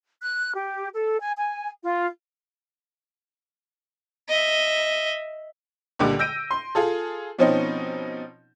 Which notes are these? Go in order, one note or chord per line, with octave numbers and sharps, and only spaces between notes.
F#6
G4
A4
G#5
G#5
F4
D#5 E5
C#2 A#2 D3 G3 D6
E6 G6 A#6 D7 D#7
C6
F4 G#4 A4
B2 F3 C4 C#4 D#4